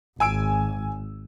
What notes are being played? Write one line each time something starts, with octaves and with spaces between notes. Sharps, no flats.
G#1 G#5 E6 D7